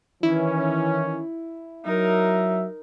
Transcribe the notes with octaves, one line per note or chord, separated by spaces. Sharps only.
D#3 E3 C#4 E4
F#3 D#4 A#4 E5